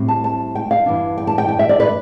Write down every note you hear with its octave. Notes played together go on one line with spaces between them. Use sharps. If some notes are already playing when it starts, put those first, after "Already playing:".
Already playing: A2 G3 C4
A5
A5
G5
F5
G2 E3 B3 D4
G5
A5
G5
G5
E5
D5
B4